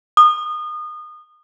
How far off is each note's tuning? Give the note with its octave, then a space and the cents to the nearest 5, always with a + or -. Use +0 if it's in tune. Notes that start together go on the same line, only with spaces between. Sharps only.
D#6 -30